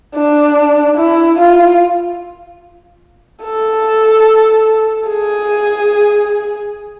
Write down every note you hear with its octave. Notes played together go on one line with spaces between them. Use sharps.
D4
E4
F4
A4
G#4